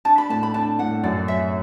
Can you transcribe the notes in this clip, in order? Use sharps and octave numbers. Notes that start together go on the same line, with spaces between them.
D4 A5
B5
A2 A5
B5
D4 A5
A2 F#5
F#2 D5
F#3 E5